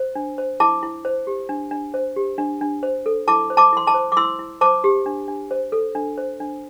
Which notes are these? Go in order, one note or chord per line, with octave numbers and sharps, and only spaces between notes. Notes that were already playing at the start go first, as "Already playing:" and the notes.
Already playing: C5
D4
C5
E4 A5 D6
E4
C5
G4
D4
D4
C5
G4
D4
D4
C5
A4
E4 A5 D6
C5
A5 D6
E4 C6
A5 D6
C5
D6
E4 C6 E6
E4
C5 A5 D6
G4
D4
D4
C5
A4
D4
C5
D4